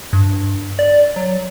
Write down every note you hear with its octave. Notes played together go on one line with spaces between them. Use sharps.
G2
D5
F#3